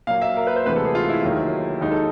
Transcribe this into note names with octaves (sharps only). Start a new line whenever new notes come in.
A#2 F#3 A#3 F5
E5
A#4
B4
C5
D2 C3 E3 G#3 B4
A4
G#4
F4
E4
D#2 D#3 F#3
D#2 D#3 G#3 D#4
A4